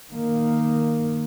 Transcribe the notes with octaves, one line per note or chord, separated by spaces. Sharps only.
D#3 A#3